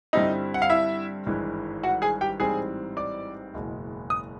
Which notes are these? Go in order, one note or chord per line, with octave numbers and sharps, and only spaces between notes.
G2 D3 G3 C4 D#4 E4 D#5
F#5
F5
E4 E5
G#1 G2 E3 G#3
F#4 F#5
G#4 G#5
G4 G5
A1 G#2 E3 G3 C4 G#4 G#5
D5 D6
F#1 E2 B2 G#3
D#6